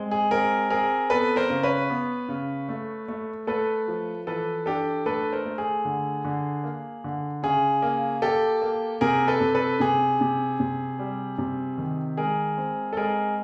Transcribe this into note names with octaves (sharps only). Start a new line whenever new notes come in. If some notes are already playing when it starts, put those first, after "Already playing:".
Already playing: G#3 C4
G#4
C4 G#4 A#4
C4 G#4 A#4
B3 A4 B4
A#4 C5
C#3
B4 C#5
B3
C#3
A3
A3
A3 A4 B4
F3
E3 A4 B4
D4 G4 A4
A3 A4 B4
A#4 C5
A3
G#4
D3
D3
A#3
D3
C#3 G#4
A#3
A#3 G4 A4
A#3
C3 G#4 A#4
A4 B4
C3
A4 B4
C3 G#4
C3
C3
G3
C3
D#3
G#3 G#4 A#4
C4
A4
G#3 G#4 A#4